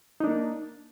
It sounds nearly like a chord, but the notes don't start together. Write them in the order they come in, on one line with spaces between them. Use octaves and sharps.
D#4 D4 A#3